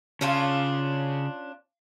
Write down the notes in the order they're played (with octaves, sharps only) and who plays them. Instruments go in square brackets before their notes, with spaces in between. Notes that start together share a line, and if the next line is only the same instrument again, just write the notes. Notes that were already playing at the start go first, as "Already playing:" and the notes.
[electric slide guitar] C#3 [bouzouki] C#4 D4 F4